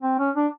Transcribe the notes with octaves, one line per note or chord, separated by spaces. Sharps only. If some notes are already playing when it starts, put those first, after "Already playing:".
C4
C#4
D4